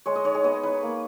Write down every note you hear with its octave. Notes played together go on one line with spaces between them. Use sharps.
G#3 C#5
D#5
D#4 C#5
G#4
B3 D#5
D#4 B4
A#3